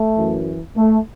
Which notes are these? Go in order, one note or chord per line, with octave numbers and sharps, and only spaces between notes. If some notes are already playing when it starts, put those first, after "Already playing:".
Already playing: A3
F#2 E3
A3